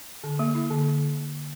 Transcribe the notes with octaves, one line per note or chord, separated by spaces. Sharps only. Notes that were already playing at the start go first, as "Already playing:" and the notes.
D3
A#3
E4
D3